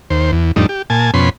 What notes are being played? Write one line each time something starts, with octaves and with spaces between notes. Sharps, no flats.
D#2 C5
E2
F2 A2 G3 D4 D#4
G4
A#2 G#5 A5
F2 B2 C#4 B5 C6